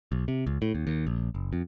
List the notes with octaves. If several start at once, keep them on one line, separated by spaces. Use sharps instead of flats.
B1
C3
C#2
A2
D#2
D#2
A#1
F#1
F2